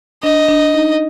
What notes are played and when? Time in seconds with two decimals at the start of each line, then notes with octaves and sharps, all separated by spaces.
0.23 D4 D#5
0.48 D4
0.74 D#4